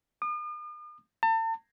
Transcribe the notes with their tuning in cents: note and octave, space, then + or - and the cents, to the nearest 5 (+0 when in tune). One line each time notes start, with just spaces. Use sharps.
D#6 -45
A5 +40